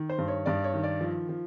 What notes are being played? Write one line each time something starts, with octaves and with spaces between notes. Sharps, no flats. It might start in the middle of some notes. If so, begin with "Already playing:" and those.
Already playing: D#3
C5
G2
C#5
G2 D5
C#5
D#3
D5
F3
F3